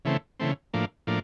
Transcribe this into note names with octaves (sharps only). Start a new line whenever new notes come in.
C#3 E3 A3 C4
C#3 E3 A3 C4
A2 F3 A#3 D4
A2 F3 A#3 D4